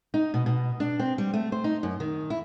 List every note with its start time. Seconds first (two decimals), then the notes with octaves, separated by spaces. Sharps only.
0.14 D#4
0.34 B2
0.46 B2
0.80 D4
0.99 C4
1.18 G3
1.34 A3
1.52 C5
1.64 D#4
1.83 F#2
2.00 D#3
2.30 E4